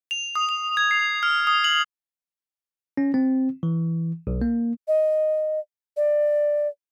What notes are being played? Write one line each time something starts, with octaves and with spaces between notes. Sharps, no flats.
F7
D#6
F7
G#6
C7
F6
D#6
F#7
C#4
C4
E3
B1
A#3
D#5
D5